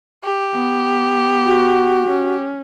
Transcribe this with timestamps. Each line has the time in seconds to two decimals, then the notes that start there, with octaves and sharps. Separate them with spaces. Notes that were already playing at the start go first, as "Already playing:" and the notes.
0.24 G4
0.53 B3
1.46 F#4
2.06 C#4